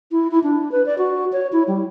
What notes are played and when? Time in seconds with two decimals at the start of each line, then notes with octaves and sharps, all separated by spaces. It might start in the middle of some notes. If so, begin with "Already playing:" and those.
0.11 E4
0.31 E4
0.43 D4
0.72 B4
0.86 D5
0.98 F#4
1.32 C#5
1.52 E4
1.68 G3